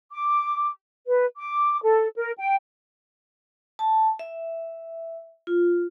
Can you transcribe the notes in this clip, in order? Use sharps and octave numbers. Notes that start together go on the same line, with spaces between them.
D6
B4
D6
A4
A#4
G5
A5
E5
F4